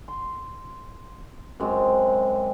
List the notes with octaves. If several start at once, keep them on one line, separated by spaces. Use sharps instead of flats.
C6
F#2 G#3 C4